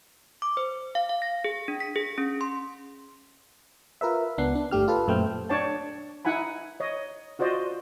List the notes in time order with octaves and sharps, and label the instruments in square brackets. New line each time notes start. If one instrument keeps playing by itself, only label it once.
[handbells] D6
C5
F5
F5
A#6
G#4
D4
B6
G#4
C#4
C6
[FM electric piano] F4 A#4 B4 E5
C#2 B3 D4 F#5 C7
D4
G1 A3 G4 F6
F4 A4 B4
F#2 A#2 A3 C5 G5 F6
[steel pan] D4 C#5 D5 G5 A5
D#4 E4 F#5 G#5 B5
C#5 D#5
F4 F#4 C5 D5 D#5